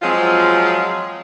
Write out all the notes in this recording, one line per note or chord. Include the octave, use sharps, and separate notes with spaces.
F3 F#3 G#3 C4 F4